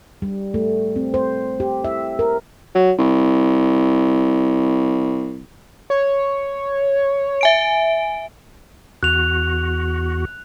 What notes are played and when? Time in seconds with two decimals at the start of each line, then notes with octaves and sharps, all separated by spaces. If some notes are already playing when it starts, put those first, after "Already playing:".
0.22 G3
0.54 A3
0.96 C4
1.14 C5
1.60 G4
1.84 E5
2.19 A#4
2.75 F#3
2.99 C2
5.90 C#5
7.41 E5 G#5 D7
9.03 E2 F#4 F#6 F7